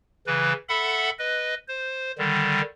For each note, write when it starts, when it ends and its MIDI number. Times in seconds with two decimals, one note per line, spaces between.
0.27 0.53 49
0.27 0.53 52
0.27 0.53 71
0.69 1.10 69
0.69 1.10 76
0.69 1.10 78
0.69 1.10 83
1.19 1.54 71
1.19 1.54 75
1.68 2.12 72
2.18 2.61 50
2.18 2.61 51
2.18 2.61 55